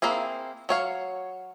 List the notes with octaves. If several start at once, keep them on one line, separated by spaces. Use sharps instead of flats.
A#3 C4 E4 G#4
F#3 C#5 F5